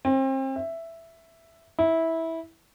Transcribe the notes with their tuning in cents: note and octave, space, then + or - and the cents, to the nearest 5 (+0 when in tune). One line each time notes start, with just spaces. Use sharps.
C4 +35
E5 +5
E4 -15